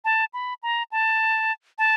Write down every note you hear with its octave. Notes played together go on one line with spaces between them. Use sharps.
A5
B5
A#5
A5
A5